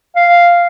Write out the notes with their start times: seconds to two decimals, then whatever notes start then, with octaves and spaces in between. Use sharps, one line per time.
0.16 F5